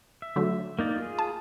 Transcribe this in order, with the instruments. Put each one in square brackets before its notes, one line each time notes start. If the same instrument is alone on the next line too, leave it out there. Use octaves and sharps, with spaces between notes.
[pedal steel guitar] E5
[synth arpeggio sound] D3 F#3 A3
[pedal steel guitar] A#3 D#4 D5
F4 G#4
[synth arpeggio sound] A5